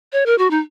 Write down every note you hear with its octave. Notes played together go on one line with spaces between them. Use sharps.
C#5
A#4
F#4
D#4